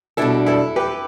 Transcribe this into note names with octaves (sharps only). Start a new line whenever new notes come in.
B2 G3 D4 E4 A4
E4 A4
G4 B4